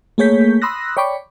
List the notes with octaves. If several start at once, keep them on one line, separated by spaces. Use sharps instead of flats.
A3 A#3 G#4 C#5 G6 B6
B5 C6 D#6 E6 F#6 A#6
C#5 D5 G5 B5 C#6 D6